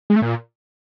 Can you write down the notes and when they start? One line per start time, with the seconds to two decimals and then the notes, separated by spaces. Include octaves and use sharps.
0.10 G#3
0.16 A3
0.22 A#2